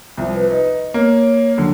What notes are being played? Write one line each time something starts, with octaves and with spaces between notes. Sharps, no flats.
C2 F3
B4
D#4 B4
A#3 C#5
C#2 D3 F#3